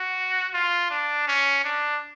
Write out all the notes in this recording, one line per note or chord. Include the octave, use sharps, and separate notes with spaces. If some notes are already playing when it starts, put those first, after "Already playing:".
Already playing: F#4
F4
D4
C#4
D4